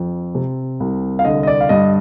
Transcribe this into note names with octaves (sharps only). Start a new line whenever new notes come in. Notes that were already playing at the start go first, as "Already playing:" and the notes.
Already playing: F2
C3
C2
F5
D3 D#5
D#5
D5
F5
G2 D#5